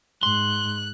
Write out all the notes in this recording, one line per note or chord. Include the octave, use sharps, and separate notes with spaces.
G#2 C6 F#6